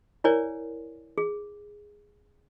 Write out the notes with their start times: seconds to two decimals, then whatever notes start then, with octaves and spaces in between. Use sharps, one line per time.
0.24 E4 A#4 C#5 D5 G#5
1.18 G#4